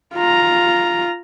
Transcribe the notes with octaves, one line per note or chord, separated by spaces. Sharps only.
F4 A#5